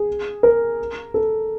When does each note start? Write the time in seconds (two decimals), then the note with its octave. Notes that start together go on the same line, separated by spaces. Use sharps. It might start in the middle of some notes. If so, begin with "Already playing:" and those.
Already playing: G#4
0.43 A#4
1.14 A4